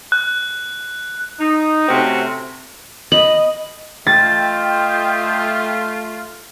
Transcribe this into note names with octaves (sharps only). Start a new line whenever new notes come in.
F#6
D#4
C3 A3 C4 C#4 F#4
D#5 B5
A3 F4 D#5 E5 G5 A6